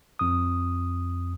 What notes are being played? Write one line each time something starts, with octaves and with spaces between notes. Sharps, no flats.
F2 D#6